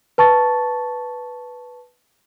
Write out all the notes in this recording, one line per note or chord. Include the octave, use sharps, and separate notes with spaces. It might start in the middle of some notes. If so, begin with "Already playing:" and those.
B4 A5 C#6 A6